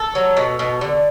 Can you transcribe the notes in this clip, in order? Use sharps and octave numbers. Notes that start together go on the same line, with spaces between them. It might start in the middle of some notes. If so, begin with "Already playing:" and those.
Already playing: A4
F#3
B2
B2
D3